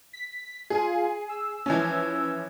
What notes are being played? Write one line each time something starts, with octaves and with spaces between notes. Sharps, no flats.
B6
F4 G#4 G#5
E6
E3 F3 C#4